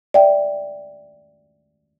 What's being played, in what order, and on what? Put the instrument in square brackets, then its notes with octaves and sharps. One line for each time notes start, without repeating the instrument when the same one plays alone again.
[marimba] D5 E5 G5